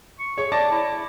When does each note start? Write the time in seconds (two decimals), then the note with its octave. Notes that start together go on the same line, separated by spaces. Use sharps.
0.19 C#6
0.38 G#4 C#5
0.52 D5 A5 D6 A#6
0.71 E4